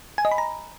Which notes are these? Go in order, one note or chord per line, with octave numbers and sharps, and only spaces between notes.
G#5
D#5
B5
A#5